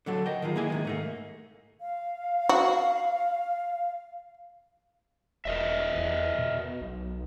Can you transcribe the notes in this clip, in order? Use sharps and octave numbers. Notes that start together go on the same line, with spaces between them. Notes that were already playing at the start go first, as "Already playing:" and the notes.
D3 F#3 A4
A#4 D#5 G5
D#3 F#3 F4 G#4
A#3 E4 G#4 G#5
C3 D#3 G#3
G#2 A3 A#3
F5
F#4
E1 A#4 D#5 E5
E2
B2
B1